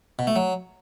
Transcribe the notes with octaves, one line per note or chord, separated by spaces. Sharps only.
B2
A3
F#3